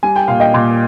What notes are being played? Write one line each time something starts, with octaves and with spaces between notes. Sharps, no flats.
G3 G#5
G5
A#2 F5
D#5 G5
A#2